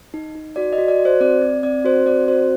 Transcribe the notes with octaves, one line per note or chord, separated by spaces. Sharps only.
D#4
D#4
F#4 D5
D#5
F#4
D5
F#4
C5
C4 D5
C4
C4 D5
F#4 C5
C4 D5
F#4 C5